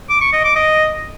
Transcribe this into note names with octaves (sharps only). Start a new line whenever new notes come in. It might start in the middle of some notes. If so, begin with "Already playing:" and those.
D6
C#6
D#5
D6
D#5